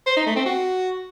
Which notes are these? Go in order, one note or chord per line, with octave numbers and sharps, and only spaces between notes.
C5
D#4
A3
C4
F#4